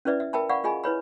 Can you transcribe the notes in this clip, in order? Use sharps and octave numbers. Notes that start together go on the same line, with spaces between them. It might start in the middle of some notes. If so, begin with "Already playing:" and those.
C#4 E4 B4 D5 E5
E5
A#4 E5 G5 A5 B5
D5 F5 F#5 B5 C#6
F4 G#4 D#5 G#5 B5
E4 B4 C#5 B5